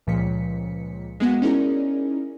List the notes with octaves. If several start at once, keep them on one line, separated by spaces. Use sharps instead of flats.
C#2 A#2 F3 B6 C#7
G#3 A#3 B3 F#4 F#5
C#4 D#4 E4 G#4 A#4 D5